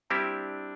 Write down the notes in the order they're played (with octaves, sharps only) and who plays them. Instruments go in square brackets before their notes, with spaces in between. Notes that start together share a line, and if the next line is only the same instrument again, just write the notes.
[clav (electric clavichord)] G3 C4 E4 G4 [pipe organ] D4